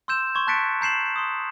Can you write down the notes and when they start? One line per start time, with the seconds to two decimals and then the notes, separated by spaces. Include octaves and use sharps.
0.08 C6 E6 G6 E7
0.35 C6 C#6 G#6
0.47 A5 F#6 A6 B6 C#7 D7
0.81 A#5 G6 C7 E7 F#7
1.16 C6 D#6